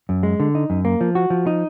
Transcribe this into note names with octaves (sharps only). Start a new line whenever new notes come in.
F#2
G#3
D3
D#4
F#2
A#3
F3
F#4
F3
D#4